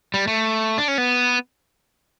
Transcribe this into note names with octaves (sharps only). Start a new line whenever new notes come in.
G3
A3
D4
C#4
B3